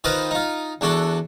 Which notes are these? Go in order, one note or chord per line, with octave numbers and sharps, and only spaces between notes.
D#3 F4 B4 C5 D#5
D#4 F4
E2 D4 F#4 A4